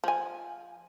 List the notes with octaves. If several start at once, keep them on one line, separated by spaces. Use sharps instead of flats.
F3 G#5